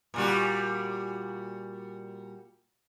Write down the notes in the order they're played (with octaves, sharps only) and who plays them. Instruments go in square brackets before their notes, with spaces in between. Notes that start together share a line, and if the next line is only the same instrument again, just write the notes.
[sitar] A#2 G3 F#4